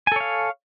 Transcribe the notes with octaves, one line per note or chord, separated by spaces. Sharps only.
A4 C#5 F5 G#5